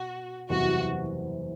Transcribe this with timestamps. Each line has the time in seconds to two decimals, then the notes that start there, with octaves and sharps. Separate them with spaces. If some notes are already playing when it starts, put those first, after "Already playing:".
Already playing: B2 F#4
0.49 F#1 E2 C3 E3 G3 F#4